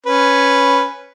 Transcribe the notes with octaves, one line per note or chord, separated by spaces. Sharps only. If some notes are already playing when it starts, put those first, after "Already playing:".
C#4 B4